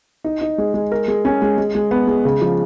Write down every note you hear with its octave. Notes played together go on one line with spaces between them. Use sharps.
D#4
D#4
G#3
G#3
A#4
G#3
C#4
G#3
G#3
G#3
B3
G#3
C#3
F3